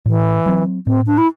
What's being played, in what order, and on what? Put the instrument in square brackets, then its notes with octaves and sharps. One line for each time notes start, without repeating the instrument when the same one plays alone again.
[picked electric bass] A2 [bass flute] E3
[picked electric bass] F#3 C4
[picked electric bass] A2 [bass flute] C4
[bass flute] D4
E4